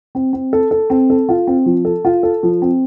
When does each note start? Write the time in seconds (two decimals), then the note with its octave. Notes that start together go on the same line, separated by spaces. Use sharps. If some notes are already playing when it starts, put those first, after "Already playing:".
0.15 C4
0.33 C4
0.53 A4
0.71 A4
0.90 C4
1.10 A4
1.29 F4
1.47 C4
1.66 F3
1.85 A4
2.05 F4
2.23 A4
2.43 F3
2.62 C4